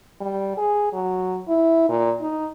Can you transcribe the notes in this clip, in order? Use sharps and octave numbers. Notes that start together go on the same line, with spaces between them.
G3
G#4
F#3
E4
A#2
D#4